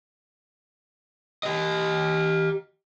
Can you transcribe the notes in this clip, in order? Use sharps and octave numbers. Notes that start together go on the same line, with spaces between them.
G4 D#5